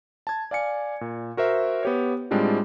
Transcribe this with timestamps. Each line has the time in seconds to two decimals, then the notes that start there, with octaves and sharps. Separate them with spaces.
0.27 A5 G#6
0.51 D5 F5 G#5 C#7
1.01 A#2
1.37 F#4 A#4 C5 E5
1.83 B3 G4 C#5
2.31 A2 G3 G#3 C4 D4 F4